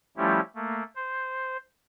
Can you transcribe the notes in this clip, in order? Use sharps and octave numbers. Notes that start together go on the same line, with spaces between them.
F3 G3 A3 C#4 E4 G4
A3 A#3
C5